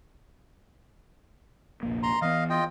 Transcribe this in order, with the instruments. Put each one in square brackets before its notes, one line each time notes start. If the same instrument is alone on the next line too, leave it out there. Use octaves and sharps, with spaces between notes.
[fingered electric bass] F1 A#1 A#3
[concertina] A#5 C6
[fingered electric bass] E3 B3 [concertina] D#5 F5
[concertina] F4 D#5 G5